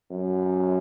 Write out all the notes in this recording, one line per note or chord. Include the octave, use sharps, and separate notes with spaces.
F#2